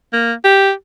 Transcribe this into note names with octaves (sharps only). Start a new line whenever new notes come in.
A#3
G4